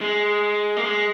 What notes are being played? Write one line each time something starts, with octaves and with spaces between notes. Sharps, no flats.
G#3
A#3
G#3